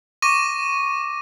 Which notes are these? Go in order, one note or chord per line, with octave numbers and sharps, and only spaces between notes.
C#6 D6 A#6 D#7